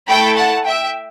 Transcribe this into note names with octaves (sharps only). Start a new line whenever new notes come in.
A3 E4 A4 G5 B5
F#5 A5
E5 G5